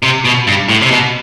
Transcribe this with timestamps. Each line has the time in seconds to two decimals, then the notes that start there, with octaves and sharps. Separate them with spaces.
0.03 C3
0.25 B2
0.47 G2
0.69 A2
0.81 C3
0.91 B2